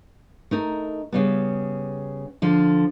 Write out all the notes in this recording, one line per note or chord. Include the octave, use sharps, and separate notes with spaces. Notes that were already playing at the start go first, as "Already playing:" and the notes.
A3 D#4 A#4
C#3 G3 B3
D3 F3 F4